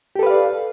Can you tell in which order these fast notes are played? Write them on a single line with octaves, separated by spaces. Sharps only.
G4 A4 B4 F5 D5